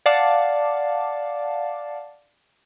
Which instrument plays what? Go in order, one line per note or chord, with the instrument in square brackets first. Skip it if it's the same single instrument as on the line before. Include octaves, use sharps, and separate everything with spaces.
[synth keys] D5 F5 F#5 A5 D6